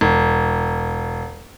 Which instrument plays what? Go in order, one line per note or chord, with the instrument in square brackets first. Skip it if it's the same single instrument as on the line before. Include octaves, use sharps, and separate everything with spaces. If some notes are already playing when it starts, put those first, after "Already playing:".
[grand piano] E1